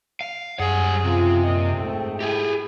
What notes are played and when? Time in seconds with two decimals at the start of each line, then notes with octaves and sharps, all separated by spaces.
0.21 F5
0.60 F#2 G3 G#4 F#5
1.04 C#2 C3 F3 F4
1.44 A#2 D#5
1.75 G#2 A3 C4 G5
2.20 E4 G4 G#4